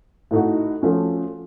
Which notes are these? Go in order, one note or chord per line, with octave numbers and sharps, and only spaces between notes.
A2 A3 D#4 F#4
F3 A3 C#4 F#4